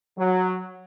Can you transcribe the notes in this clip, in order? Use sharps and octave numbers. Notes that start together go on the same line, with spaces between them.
F#3